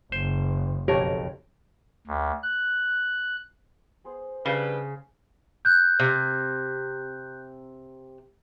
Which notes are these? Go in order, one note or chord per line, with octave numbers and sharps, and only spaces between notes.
F#1 C5
B1 F2 G4 A#4 C#5 A5
D2
F#6
B3 G#4 C5
C#3 G3 D4 B4
F#6 G6
C3